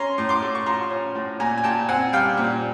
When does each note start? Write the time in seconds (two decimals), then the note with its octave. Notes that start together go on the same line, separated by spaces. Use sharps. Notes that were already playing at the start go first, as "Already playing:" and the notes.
Already playing: C#4 A#5 C6
0.18 A2
0.29 C6 D6
0.42 A3
0.55 C#6
0.66 F3 A#5 C6
0.90 C#4
1.15 A2
1.40 A#2 G#5 A#5
1.58 G#5
1.64 A#2 G5 A5
1.89 C4 F#5 G#5
2.13 G3 F5 G5
2.37 A#2